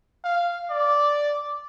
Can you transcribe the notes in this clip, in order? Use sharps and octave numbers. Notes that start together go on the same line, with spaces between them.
F5
D5